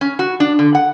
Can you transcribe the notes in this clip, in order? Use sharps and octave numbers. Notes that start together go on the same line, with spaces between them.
C#4
F#4
D4
D3
F#5